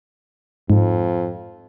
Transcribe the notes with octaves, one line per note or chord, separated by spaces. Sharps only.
F2 G#2